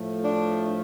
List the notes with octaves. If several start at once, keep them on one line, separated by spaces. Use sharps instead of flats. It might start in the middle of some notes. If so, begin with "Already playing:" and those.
Already playing: A2 F3 A3
D4